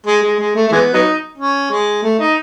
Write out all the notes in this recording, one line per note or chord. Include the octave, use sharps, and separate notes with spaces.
G#3
G#3
G#3
A3
A3
E3 G#3 B3
F#3 B3 D#4
C#4
G#3
A3
D#4